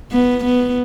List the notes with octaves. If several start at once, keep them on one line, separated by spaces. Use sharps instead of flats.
B3
B3